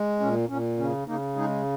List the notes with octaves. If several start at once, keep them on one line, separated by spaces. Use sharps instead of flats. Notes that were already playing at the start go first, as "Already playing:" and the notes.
Already playing: G#3
A#2 C#4
A#2 C#4
C#3 C#4
C#3 A#3 D#4
G#3 D#4 G#4